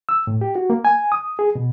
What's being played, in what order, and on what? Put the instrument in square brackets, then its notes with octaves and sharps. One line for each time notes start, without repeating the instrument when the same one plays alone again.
[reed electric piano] E6
A2
G4
F#4
A#3
G#5
D#6
G#4
B2